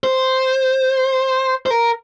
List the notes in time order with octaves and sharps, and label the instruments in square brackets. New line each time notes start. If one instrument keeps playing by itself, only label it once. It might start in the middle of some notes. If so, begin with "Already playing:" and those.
[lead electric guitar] C5
C5
A#4